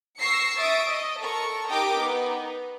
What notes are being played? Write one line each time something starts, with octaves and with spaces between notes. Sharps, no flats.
C#6 E6 A#6 C7 C#7
E5 C#6 D#6 A6 D7
D#5
A4 A#4 C#6
D#4 G4 A#4 D#5 G5 D6
B3 D#4